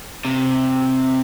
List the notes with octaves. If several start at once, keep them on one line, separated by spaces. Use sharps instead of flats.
C3